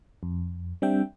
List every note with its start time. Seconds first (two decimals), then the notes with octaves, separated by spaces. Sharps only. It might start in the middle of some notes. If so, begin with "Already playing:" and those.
0.23 F2
0.82 G3 C4 D4 E5 G5